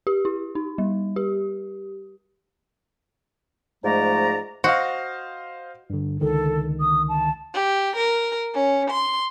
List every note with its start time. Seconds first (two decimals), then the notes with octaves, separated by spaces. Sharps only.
0.07 G4
0.25 E4
0.55 D#4
0.78 G3
1.16 G4
3.84 G#2 F3 G#3 A3 D5 A#5
4.64 F#4 C5 D#5 F5
5.90 G2 D3
6.21 C#2 D3 D#3 A4
6.80 D#6
7.09 A5
7.55 G4
7.97 A#4
8.54 C#4
8.91 C6